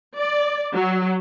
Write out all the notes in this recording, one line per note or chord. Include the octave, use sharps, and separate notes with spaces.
D5
F#3